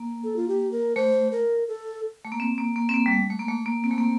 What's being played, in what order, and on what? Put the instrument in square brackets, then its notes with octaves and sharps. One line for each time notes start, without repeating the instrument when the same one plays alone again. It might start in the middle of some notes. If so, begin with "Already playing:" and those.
Already playing: [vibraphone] A#3
[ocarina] A4
F4
G4
A#4
[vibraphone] A3 [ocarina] C5
[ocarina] A#4
A4
[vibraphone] A3
A#3
C4
A#3
A#3
C4
A#3
G3
A3
A3
A#3
A3
A#3
[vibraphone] A#3 [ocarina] C4
[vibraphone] A3
A#3